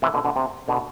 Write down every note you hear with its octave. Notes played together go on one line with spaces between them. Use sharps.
C3 E3
B2 D3
B2 D3
C3
B2 D3